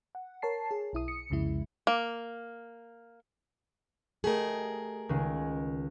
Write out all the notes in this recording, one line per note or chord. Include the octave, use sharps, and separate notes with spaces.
F#5
A#4 C#5 A5 C7
G#4
B1 E4 D#6
C#7
C2 F2 C#3 G#3 E4
A#3
A3 G4 G#4 A#4 D#5
C#2 D#3 G#3